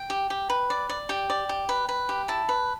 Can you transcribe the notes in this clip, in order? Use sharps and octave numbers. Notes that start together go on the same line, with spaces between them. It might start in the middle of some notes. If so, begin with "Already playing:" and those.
Already playing: G5
G4
G4
B4
D5
D5
G4 G5
D5
G4
B4
B4
G4
E4 A5
B4